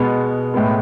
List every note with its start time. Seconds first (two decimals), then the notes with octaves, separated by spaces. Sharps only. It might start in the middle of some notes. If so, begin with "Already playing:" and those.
Already playing: B2 G#3 B3
0.54 A2 G#3 B3